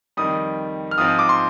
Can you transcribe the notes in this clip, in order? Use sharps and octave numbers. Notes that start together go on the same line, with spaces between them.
F2 D#3 G3 D#6
F6
G#2 F3 C4 D#6
D#6
D6
C6